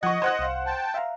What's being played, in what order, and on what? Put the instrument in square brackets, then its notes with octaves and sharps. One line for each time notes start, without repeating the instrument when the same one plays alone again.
[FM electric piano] F3 G#6 [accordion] D#5 [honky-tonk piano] F#5 C#6
[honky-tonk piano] C5 F#5 F#6 [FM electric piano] G#6
[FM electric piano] C2 F5
[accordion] G5 A5
[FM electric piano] E5 F5 A#5